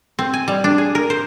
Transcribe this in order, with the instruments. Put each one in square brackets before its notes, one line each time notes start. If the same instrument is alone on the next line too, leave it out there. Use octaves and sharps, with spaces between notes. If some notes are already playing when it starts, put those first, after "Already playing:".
[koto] C4
G#5
G3
D4
G#4
A#4
C5